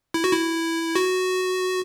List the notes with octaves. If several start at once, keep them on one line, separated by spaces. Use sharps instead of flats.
E4
F#4
E4
F#4